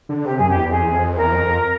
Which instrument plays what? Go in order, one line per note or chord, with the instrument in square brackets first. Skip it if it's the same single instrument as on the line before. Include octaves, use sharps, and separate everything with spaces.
[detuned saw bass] D3
[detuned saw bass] C3 [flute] G4
[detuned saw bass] F#2 [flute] G#4
[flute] G4
[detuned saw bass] E2
[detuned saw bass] F2 [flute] G#4
[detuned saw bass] E2
F2
[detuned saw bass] E2 [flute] A#4
[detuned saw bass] F2
F2